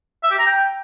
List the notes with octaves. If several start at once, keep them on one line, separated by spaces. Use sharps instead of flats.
E5
G4
A#5
G5